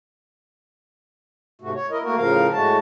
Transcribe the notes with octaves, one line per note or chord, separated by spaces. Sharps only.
G#2 C3 A3 F#4
C#5
E4 A#4 D#5
A3 A#3 F#4 A#4
A2 C#3 F3 A#4 F5
A2 G#3 A3 F#4 A5